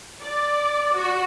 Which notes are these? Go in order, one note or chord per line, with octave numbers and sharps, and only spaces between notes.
D5
F#4